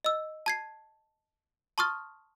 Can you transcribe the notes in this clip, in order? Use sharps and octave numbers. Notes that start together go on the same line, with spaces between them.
D#5 E6
A5 G#6 C7
A5 C6 C#6 D#6 F6 A6